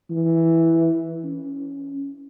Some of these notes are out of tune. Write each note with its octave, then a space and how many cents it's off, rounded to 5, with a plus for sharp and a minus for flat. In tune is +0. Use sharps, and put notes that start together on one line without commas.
E3 +0
C#4 +5